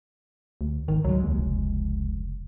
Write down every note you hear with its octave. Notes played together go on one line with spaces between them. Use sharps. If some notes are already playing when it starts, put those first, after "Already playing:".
D2
G#1 D#3
C#2 F3 F#3 G#3
D#2
F1